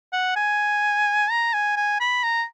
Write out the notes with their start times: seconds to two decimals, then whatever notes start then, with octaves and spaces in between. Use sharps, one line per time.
0.13 F#5
0.36 G#5
1.31 A#5
1.53 G#5
1.76 G#5
2.00 B5
2.23 A#5